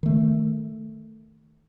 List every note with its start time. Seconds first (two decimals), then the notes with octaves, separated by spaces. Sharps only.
0.03 D#3 A3